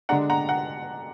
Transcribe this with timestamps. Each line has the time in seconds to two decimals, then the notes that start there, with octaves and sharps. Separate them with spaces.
0.09 D3 G#3 D4 F#5 A#5
0.30 F#5 A#5
0.49 F#5 A#5